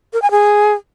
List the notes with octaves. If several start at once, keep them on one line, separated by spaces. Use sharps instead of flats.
A#4
G#5
G#4